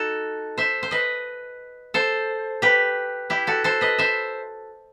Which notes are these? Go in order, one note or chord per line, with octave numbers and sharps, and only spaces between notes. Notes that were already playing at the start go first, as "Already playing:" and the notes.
Already playing: D#4 F#4 A4
C5 E5
C5
B4 D#5
A4 C5
G4 B4
E4 G4
F#4 A4
A4 C5
B4 D#5
C5 E5